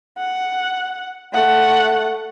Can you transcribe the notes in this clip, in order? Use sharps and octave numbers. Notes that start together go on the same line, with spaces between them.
F#5
A3 F#5